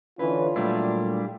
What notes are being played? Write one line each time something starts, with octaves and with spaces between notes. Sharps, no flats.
D3 E3 C#4 E4 F4 B4
A#2 F#3 G3 A3 D4 E4